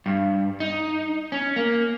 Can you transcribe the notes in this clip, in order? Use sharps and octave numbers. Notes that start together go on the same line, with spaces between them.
G2
D#4
C#4
A#3